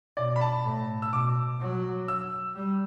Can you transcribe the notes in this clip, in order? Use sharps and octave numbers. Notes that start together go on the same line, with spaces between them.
B2 D5
B5
A5
A2
E6
B2 D6
F#3
E6
G3